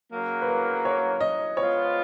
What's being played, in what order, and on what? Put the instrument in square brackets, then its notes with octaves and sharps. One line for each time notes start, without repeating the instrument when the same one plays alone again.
[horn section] C#3 F#3 A#3
[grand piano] B4
A#4
C#5
D#5
[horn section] F3 G#3 B3 F4 [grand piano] C#5